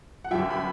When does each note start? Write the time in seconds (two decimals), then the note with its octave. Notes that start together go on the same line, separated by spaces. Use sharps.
0.24 F#5
0.31 G1 F#2 F#3 E5 G5
0.50 B5